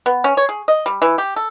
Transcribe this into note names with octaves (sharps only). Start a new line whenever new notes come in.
B3
C#4
C#5
G#4
D#5
G3
E3
G4
A4